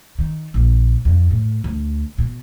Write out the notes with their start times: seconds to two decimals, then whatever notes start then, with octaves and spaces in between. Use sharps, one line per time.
0.19 D#3
0.54 A#1
1.05 F2
1.30 A2
1.64 D2
2.18 B2